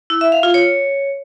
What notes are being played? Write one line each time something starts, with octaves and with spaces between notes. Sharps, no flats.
E4
E5
F5
F4
C#5